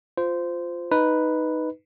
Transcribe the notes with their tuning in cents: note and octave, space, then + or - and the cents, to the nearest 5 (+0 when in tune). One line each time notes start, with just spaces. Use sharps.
F4 +0 C5 -15
D#4 +0 B4 +0